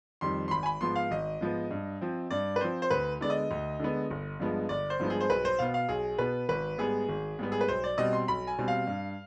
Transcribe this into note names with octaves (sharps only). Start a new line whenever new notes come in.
F2 D#3 G3 C6
C6
G#1 B5
G#5
B5
G#2 F3 B3 C6
F5
G#1 D#5
G#2 F3 B3
G2
F3 C4
G2 D5
B4
F3 C4 C5
C5
D2 B4
D3 G#3 B3 D5
D#5
D2
D3 G#3 B3
G1
G2 F3 G#3 B3
G1 D5
C5
G2 F3 G#3 B3
G#4
C5
B1 B4
C5
B2 B3 F5
F5
B1 G#4
B2 B3 B4
G#1 B4
G#2 G3 B3 G#4
G#1
G#2 G3 B3
G#4
B4
B1 C5
D5
B2 G3 C4 D#5
C6
B1 B5
G#5
B2 G3 C4
F5
G2